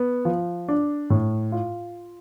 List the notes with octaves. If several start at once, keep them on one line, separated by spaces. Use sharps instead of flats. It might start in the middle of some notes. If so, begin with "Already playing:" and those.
Already playing: B3
F3
D4
A2
F4